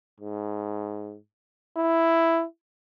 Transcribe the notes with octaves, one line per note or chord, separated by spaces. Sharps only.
G#2
E4